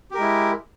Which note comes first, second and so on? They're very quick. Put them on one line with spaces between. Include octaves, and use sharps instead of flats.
G4 A#4 G#3 E4